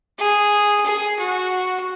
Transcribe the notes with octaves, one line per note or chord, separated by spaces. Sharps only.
G#4
G#4
F#4